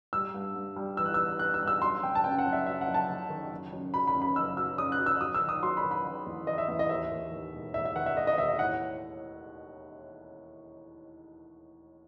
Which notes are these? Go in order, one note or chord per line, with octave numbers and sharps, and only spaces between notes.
G3 E6
G2
G2
G3
E3 E6
F#6
E6
B3
B3 F#6
E6
G2
E6
F#3 C6
F#1 G5
A5
F#2 G5
F#5
F#2
E5
F#3 E5
F#5
F#1
A5
F#1
D#3
F#1
F#2
F#3 B5
B5
F#2
B5
F#1 E6
F#3 E6
F#2 D#6
F#6
F#3
E6
F#3 D#6
E6
D#3
D#6
F#3 C6
B5
D#3
B5
D#3
E2
D#3 D#5
E5
E2 E5
D#5
D#2 E5
D#2
D#2
E1
D#2 E5
E5
D#3 F#5
E5
E1 D#5
D#5
D#2 E5
D#5
A2 F#5